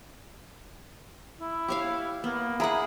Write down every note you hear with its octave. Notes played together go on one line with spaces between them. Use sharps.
E4
G4 C#5 F5
A#3 B3
E4 G#4 A#4 F#5 B5